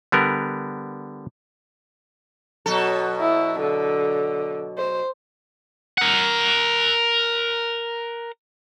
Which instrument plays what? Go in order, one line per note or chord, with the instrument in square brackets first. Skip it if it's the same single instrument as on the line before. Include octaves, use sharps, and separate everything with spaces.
[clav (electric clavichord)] D3 G3 B3 A#4
[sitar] B2 F#3 A4
[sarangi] E4
D3
C5
[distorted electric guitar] A#4 F#5